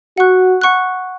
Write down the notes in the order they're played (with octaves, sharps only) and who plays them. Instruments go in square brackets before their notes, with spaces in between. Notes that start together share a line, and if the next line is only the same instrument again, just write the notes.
[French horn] F#4 [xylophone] F#5 C#6 F#6
[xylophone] F#5 C#6 F#6